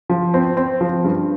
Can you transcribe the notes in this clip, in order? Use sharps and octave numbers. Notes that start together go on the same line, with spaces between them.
F3
C4
C4
F3
G2